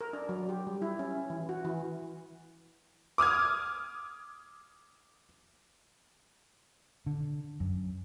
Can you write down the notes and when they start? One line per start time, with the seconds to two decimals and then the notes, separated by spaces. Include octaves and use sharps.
0.01 A#4
0.13 D4
0.29 F#3
0.49 G4
0.67 G3
0.82 E4
0.99 C#4
1.30 E3
1.49 F#4
1.65 E3
3.18 D6 D#6 F6 G#6
7.06 D3
7.60 F#2